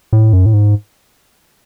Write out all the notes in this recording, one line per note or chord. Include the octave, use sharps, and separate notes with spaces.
A2
F#2
A2
G#2